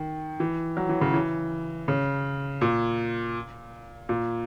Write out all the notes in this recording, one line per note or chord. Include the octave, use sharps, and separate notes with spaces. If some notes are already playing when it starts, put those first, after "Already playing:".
Already playing: D#3
E3
F#3
E3
C#3
E3
C#3
A#2
A#2